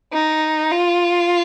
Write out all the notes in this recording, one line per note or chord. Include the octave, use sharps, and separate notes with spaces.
D#4
F4